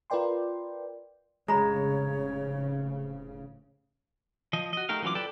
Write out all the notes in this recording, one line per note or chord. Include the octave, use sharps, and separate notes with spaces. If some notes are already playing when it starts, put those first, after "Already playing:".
F4 A#4 B4 D5 G5 C6
F1 A2 C#3 G#3 C#5 A#5 B5
F3 D#5
F#4 D#5
A3 D#4 G4 A#4 F5
E3 F#3 C#4 F4 D6
A4 B4 D5 G5 A5